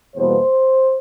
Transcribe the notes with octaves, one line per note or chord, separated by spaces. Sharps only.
E2 B2 G3 A#3 C5